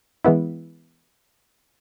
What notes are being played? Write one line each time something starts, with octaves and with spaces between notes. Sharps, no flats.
E3 G#3 B3 E4